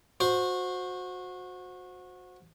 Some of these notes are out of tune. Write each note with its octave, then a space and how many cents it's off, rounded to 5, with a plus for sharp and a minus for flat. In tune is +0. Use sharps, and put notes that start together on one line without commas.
F#4 -25 C5 +0